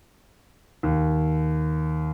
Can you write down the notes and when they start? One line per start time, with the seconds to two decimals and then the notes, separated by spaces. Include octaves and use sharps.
0.83 D#2